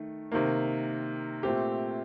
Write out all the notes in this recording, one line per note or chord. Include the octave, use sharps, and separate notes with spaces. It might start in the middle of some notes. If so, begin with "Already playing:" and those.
Already playing: D#3 A3
C3 D#3 A#3
A#2 A3 C4 G4